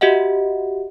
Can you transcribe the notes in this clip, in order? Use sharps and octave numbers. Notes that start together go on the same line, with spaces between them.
F#4 G4 D#5 E5 F#5